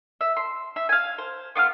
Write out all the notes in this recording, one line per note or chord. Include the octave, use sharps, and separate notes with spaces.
E5
C6
E5
F5 G#5
C5
B3 F4 D6 F6